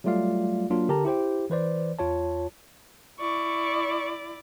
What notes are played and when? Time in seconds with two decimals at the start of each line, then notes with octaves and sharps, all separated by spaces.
0.04 F#3 G3 A3 F4 D5 F5
0.70 F#3 A#3 D4 F4
0.89 D3 G4 A#4 A5 A#5
1.05 E4 G4 C5 G5
1.50 E3 B4 C5 D5
1.99 E2 F4 C#5 A5
3.20 E4 D5 C#6